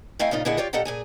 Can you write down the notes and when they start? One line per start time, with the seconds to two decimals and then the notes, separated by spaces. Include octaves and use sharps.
0.19 A3 C4 E4 D#5 F5 G#5
0.31 A#2 C#3 D#4 F4
0.45 A#2 D3 E4 G#4 D#5 F#5
0.57 F4 G4 C#5 D5
0.73 A#2 G4 A4 D#5 F#5 A#5
0.85 A#2 G#4 G#5